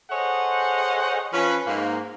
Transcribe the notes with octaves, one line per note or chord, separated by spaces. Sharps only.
G#4 A4 C5 C#5 D#5 F#5
F3 C#4 B4
G#2 A#3